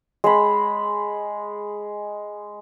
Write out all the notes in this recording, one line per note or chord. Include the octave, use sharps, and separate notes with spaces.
G#3 B5